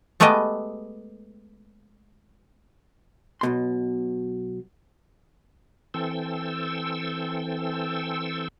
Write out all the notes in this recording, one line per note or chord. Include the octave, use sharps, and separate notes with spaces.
G#3 A3 B3 G4 B4 D#5
B1 B2 C6
E3 C4 A4 G5 E6